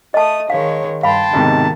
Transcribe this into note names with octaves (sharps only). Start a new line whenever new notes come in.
A3 D#5 A5 D#6
D#3 G#3 C#5 F5
G2 F5 G5 A5 B5 C6
B1 G#2 C3 D#3